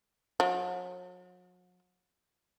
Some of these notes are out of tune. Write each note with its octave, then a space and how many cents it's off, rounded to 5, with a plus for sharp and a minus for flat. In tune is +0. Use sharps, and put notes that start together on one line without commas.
F#3 -40